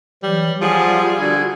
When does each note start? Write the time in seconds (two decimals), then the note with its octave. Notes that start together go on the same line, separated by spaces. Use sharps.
0.23 E3 F#3 G3
0.61 F3 G3 F4 G#4 F#5
1.20 D3 D4 F#4 G#6